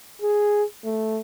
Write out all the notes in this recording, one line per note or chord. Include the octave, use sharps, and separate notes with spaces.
G#4
A3